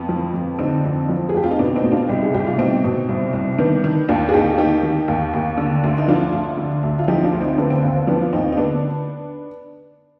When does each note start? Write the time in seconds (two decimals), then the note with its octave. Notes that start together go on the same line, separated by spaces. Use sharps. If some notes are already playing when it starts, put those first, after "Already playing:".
Already playing: F2 B3
0.09 F3
0.34 F2
0.59 D3 C4 D#4
0.84 F2
1.09 F3
1.29 G#4
1.35 F2 G4
1.44 F4
1.51 D#4
1.59 B2 B3 D4
1.76 C4 D#4
1.83 B2
1.92 D4 F4
2.08 C2 D#4 G4
2.23 G#4
2.34 C2 G4
2.47 F4
2.58 B2 C4 D#4
2.84 B2
3.09 C2
3.33 C2
3.58 D#3 B3 D4
3.84 D#3
4.09 D#2 D4 F4
4.29 G#4
4.33 D#2 D#4 G4
4.58 D#3 D#4 G4
4.83 D#3
5.08 D#2
5.33 D#2
5.58 D3
5.84 D2
5.98 D#4
6.08 F3 D4 F4
6.32 D2
6.57 D3
6.83 D2
6.99 F4
7.08 F3 D#4 G4
7.24 D4 F4
7.33 D2
7.41 C4 D#4
7.58 D3 B3 D4
7.70 C4
7.83 D#2
7.96 C4
8.07 F3 B3 D4
8.21 F4
8.33 D#2 C4 D#4
8.52 D#4
8.57 D3 B3 D4